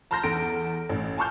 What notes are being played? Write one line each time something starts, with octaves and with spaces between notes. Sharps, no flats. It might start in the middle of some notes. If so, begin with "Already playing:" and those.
A5 A#5 C6 F6 G6 A#6
E2 A4 D7
A1
G#5 A5 C6 C#6 F6 G6